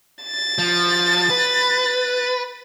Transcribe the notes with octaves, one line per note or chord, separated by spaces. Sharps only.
A6
F3
B4